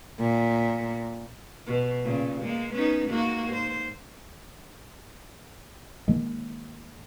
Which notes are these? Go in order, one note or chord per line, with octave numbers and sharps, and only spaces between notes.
A#2
B2
A#2 C#3
G#3 A#3
B3 C#4 D#4
G#2 A#3 F#4
G#2 C5
G#2 D#3 G#3 A#3